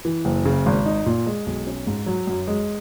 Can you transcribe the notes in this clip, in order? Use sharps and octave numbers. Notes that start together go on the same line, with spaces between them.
E3
F#1
C#3
G#1
D#4
A#2
G#3
B1
C#4
G#2
F#3
F#2
G#3